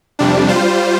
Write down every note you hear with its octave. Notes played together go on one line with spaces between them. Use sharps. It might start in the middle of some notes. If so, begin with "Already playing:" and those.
F2 C3 G3 D4
G3 F4 C5